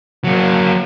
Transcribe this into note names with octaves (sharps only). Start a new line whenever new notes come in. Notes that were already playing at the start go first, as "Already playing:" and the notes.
F#3 A#3